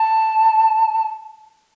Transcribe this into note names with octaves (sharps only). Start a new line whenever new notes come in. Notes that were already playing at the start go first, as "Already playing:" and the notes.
Already playing: A5